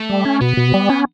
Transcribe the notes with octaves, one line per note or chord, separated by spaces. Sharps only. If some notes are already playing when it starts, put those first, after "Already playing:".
Already playing: A3
G3
C#4
B2 B3
B2
G3
C#4